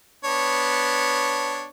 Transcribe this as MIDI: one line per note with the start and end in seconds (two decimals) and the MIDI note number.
0.25 1.67 59
0.25 1.67 62
0.25 1.67 73